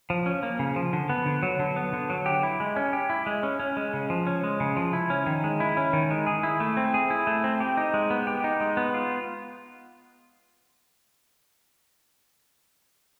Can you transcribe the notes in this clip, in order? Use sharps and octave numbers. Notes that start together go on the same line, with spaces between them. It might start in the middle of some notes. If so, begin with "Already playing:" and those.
F3
C#4
A#3
C#3
F3
D3
B3
D3
F#3
D3
B3
D3
F#3
G4
E4
G#3
C#4
G4
E4
G#3
C#4
C#4
G#3
C#3
F3
C#4
G#3
C#3
F3
E4
C#4
D#3
G#3
E4
C#4
D#3
G#3
G#4
E4
A3
C4
G#4
E4
A3
C4
G4
D#4
G#3
B3
G4
D#4
G#3
B3
F4